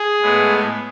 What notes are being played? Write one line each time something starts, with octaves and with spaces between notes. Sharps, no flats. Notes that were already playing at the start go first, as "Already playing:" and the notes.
Already playing: G#4
A2 G#3 B3